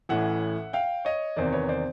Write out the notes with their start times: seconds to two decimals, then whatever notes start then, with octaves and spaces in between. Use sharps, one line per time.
0.09 A1 A2 E3 E5 F#5
0.73 F5 G5
1.05 C#5 D#5
1.37 E2 C3 D#3 C5 D5
1.52 B4 C#5
1.69 C5 D5